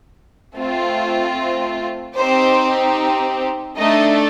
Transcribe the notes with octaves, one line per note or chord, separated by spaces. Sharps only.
A3 C4 F4
C4 D#4 G4 C5
A3 D4 D#4 A4 D#5